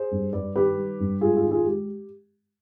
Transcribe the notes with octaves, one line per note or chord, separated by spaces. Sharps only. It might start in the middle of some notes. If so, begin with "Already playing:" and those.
Already playing: G#4 C5
G2
G2 B4 D5
D#3 G4 B4
G3
G2
G#2 F4 G#4
F4 G#4
D#3
F4 G#4
G#3 G4